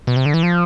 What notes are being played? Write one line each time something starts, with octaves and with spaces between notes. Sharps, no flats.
B2
C3
D3
E3
F3